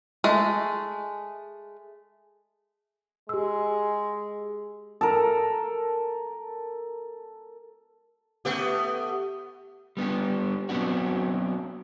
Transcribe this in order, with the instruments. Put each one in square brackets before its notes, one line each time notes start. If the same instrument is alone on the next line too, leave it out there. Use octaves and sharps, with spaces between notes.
[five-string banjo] G#3 A3
[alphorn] G#3 [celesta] G4 E6
[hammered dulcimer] A4 A#4
[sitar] A3 B3 G4
[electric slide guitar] G3 B3 D4 G4
F#3 B3 C4 D4 F#4